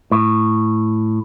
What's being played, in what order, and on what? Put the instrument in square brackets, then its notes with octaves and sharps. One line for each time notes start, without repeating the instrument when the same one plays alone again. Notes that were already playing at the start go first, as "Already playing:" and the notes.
[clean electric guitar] A2